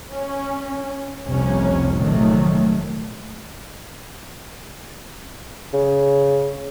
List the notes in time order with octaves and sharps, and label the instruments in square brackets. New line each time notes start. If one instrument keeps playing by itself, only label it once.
[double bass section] C#4
F1 C2 F2 C3 C#4
F1 A#2 D#3 F#3 A3
[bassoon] C#3